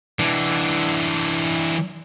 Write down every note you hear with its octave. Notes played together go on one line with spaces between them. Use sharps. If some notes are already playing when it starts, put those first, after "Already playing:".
E3 D4